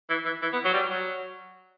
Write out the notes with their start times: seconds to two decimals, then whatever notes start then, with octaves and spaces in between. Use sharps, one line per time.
0.10 E3
0.25 E3
0.42 E3
0.53 B3
0.65 F#3
0.74 G3
0.90 F#3